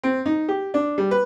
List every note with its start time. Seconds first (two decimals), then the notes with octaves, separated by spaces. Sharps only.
0.03 C4
0.26 D#4
0.48 G4
0.74 D4
0.98 G3
1.11 B4